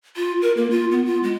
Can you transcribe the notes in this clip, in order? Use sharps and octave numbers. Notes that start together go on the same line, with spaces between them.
F4
A#4
A#3
F4
B3
F4
G#3